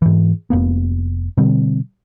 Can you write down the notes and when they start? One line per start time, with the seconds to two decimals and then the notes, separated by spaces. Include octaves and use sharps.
0.02 G#2 E3
0.50 F1 A#3 B3
1.38 B2 D3 G3 C4